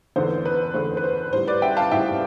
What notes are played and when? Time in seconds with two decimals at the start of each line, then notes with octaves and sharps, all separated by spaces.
0.16 E2 D3 A3 C5
0.45 B4
0.74 E2 D3 A3 C5
0.97 B4
1.04 C5
1.33 A2 G3 C5
1.47 B4 D5
1.62 E5 G5
1.77 F5 A5
1.91 A2 G3 E5 G5